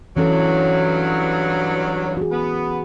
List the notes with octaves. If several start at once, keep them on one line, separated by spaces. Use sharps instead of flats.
G2 E3 F#3 C#4 A4
F#4 G#4
B3